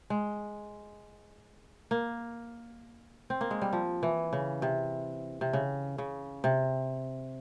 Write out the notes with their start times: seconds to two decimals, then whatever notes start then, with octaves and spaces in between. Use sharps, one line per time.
0.10 G#3
1.91 A#3
3.30 C4
3.41 A#3
3.51 G#3
3.62 G3
3.73 F3
4.03 E3
4.33 C#3
4.62 C3
5.41 C3
5.53 C#3
5.98 C#3
6.44 C3